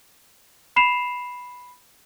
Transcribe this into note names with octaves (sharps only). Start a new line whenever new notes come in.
B5 C7 E7 F7